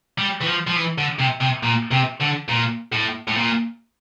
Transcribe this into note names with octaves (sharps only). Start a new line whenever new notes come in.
G3
E3
F3
F3
E3
D3
C3
C3
A#2
C3
D3
A#2
A2
A2
A#2